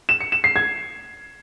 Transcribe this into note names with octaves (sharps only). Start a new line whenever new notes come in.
E7
C#7
E7
C7
G#6